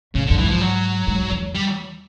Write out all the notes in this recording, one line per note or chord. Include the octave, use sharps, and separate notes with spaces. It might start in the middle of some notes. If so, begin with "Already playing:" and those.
A2 C#3
D3
G2
G#2 E3
F3
F#3
G#2
E2
G3